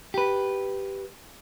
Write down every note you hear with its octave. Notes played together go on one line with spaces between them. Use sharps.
G4 B4